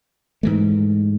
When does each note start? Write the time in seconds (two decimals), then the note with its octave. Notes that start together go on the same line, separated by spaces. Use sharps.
0.43 G#2 E3 A3